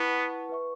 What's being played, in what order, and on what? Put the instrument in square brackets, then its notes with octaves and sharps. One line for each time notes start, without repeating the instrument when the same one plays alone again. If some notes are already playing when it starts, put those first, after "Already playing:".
Already playing: [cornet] B3 [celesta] E4 B4 F#5 A5 C#6
[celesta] B4 E5 C#6